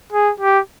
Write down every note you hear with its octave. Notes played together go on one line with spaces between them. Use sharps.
G#4
G4